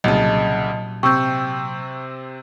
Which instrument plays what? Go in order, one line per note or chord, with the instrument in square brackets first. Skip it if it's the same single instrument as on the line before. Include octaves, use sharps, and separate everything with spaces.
[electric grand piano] C2 C#3 [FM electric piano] A#2 F#3 [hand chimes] D#5 A5
[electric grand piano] C3 C4 [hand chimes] G5 [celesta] C#6 E6 G6